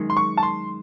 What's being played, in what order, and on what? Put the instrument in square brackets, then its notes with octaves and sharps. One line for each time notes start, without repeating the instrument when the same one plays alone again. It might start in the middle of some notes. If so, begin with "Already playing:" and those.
Already playing: [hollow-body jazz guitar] F#2 D#3 G#3
[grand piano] C6
C#6
A5
C6